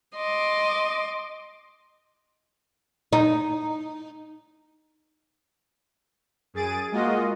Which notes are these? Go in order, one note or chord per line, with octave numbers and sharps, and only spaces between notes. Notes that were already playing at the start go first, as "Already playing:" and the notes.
D#5 C6 D6
D#4
F#2 G#4 A6 D7 D#7
G#3 A#3 F4 F#4 D#5